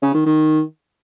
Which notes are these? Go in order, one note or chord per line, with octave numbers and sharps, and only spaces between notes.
C#3
D#3
D#3